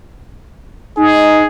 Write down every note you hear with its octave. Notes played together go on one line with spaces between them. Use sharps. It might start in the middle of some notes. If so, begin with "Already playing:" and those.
D#4 G#4